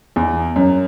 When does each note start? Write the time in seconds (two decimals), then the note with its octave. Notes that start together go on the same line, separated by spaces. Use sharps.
0.16 E2
0.56 F#2